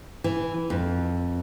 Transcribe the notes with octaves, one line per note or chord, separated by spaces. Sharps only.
E3
F2